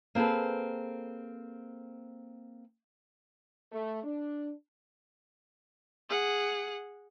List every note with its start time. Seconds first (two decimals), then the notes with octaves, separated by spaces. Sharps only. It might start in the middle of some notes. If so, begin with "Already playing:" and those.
0.15 A#3 C4 G#4 A4 B4
3.71 A3
4.04 D4
6.10 G#4 F#5